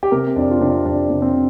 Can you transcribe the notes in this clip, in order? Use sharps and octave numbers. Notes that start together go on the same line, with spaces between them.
G4
C3 A#4
F2 D4
F4
C3 D4
F2 D4
C3
C4